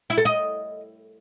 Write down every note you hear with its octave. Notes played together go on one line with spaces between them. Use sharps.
E4
A4
D#5